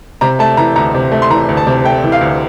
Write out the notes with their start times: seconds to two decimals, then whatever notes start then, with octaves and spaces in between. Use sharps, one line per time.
0.21 C3 A#5
0.39 A3 A5
0.57 E3 A#5
0.76 D2 A#5
0.94 C3
1.12 A3
1.22 C6
1.30 E3 A#5
1.49 D2
1.57 A5
1.67 C3
1.84 A3 G5
2.04 E3
2.12 F5
2.21 D2